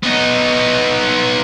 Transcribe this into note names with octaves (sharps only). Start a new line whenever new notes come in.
B3 D#4